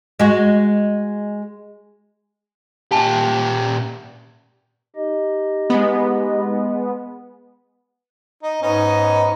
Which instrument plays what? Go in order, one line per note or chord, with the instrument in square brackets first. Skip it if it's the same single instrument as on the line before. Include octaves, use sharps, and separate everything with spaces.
[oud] G#3 F#4
[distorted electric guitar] A#2 G4 [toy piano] G#5 A5
[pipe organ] D#4 G4 D#5
[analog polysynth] G#3 B3
[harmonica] D#4
[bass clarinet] G#2 [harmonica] B3 C#4 D#4